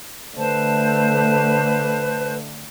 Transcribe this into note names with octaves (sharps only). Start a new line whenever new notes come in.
D3 A3 B4 C5 A5